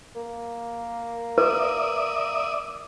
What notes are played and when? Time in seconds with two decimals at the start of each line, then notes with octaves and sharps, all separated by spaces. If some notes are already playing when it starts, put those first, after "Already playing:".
0.15 A#3
1.38 B4 D5 E5 D#6